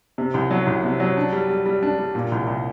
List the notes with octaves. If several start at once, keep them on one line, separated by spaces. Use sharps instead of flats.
C3
C2
F#3
C2
C3
F#3
D4
G3
G3
G3
D4
G3
A#2
C2
C2